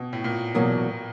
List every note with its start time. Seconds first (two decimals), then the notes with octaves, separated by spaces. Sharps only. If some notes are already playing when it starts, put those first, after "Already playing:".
Already playing: B2
0.13 A2
0.24 A#2
0.55 E2 B2 F#3 A#3